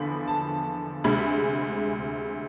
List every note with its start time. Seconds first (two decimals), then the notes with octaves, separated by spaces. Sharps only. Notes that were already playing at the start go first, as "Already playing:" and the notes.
Already playing: E2 D3 F3 B5
0.28 A5
1.04 D2 C3 G#3 B5